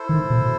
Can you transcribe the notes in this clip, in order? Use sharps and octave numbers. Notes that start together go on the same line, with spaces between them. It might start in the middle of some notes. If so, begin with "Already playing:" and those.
Already playing: E4 A4 C5
D#3
B2